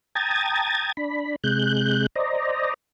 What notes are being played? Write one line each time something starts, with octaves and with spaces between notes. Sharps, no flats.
G5 A5 A#5 D#6 G#6 A6
D4 B5
C3 G#3 F#6 G6
C5 D5 D#5 A#5